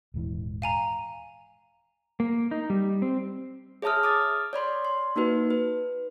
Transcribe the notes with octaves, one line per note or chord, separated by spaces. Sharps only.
D#1 G#2 E3
F5 G#5 A#5
A#3
D#4
G3
C4
G#4 C#5 E5 A5 D#6 F6
D6 D#6 F6 A6
C#5 D5 B5 C6
C6
A#3 D#4 F#4 B4
B4